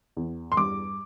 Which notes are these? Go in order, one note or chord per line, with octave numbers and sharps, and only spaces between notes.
E2
C6
G2 D6